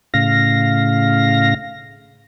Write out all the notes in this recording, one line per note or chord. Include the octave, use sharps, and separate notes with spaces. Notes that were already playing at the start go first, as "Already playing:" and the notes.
A2 C#3 F5 A#6